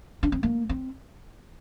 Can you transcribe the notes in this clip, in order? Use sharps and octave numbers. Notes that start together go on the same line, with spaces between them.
D4
C4
A#3
C4